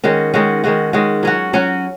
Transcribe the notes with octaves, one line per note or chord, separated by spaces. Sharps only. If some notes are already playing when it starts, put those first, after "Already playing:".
D#3 G#3 C#4 F#4
D#3 G#3 C#4 F#4
D#3 G#3 C#4 F#4
D#3 G#3 C#4 F#4
F#3 C#4 F#4
F#3 C#4 F#4